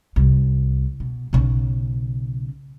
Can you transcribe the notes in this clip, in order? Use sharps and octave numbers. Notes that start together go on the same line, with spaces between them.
C2
B2
B1 C#3